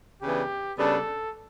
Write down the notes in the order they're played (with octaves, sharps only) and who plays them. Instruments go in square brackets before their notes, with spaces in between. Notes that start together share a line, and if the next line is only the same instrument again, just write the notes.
[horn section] C#3 E3 B3 D4 G4
C#3 G3 B3 D4 A4